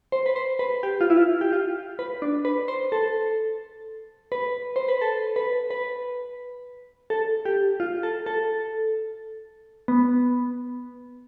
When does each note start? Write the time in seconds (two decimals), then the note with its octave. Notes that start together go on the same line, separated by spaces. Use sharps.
0.12 C5
0.26 B4
0.36 C5
0.59 B4
0.83 G4
1.01 F4
1.10 E4
1.17 F4
1.41 G4
1.53 F4
1.99 B4
2.22 D4
2.45 B4
2.68 C5
2.92 A4
4.32 B4
4.76 C5
4.88 B4
5.01 A4
5.36 B4
5.70 B4
7.10 A4
7.45 G4
7.80 F4
8.03 A4
8.26 A4
9.88 B3